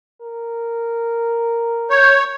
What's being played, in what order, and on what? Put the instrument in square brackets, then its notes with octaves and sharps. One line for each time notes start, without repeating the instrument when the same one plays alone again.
[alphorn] A#4
[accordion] C#5 [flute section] G6